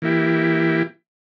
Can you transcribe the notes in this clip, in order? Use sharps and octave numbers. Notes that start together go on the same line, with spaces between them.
E3 A#3 E4 G4